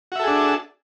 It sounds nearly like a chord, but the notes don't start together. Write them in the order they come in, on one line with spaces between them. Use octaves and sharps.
F#4 E5 A4 G#4 D4